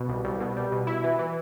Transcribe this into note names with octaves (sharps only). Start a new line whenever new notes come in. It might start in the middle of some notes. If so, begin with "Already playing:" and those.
Already playing: B2
C2
C2
B2
G3
B2
E4
E3
E3